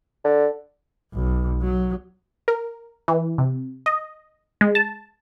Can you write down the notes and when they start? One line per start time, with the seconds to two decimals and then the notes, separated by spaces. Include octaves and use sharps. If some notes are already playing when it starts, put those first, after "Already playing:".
0.25 D3
1.13 B1
1.62 F#3
2.48 A#4
3.08 E3
3.38 C3
3.86 D#5
4.61 G#3
4.75 A5